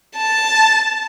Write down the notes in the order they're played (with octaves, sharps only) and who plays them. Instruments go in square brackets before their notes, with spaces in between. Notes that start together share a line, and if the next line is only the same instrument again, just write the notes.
[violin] A5